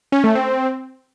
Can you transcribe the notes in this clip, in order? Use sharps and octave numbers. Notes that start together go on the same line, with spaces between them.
C#4
A3
C4